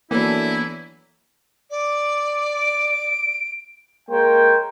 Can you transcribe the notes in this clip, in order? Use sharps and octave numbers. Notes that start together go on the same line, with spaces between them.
E3 F#3 A#3 B3 D4 E4 A4
D5
D7
G#3 A#3 A#4 C5 C#5 G5